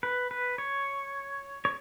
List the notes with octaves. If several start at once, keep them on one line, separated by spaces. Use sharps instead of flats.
B4
B4
C#5
C#5